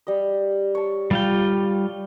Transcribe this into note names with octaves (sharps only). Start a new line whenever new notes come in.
G3 D#5
C#5 A5
G3 F4 G5